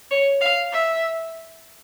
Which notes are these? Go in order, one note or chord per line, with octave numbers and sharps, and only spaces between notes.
C#5
F5
E5